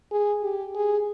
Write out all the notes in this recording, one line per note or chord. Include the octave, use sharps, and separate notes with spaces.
G#4
G4
G#4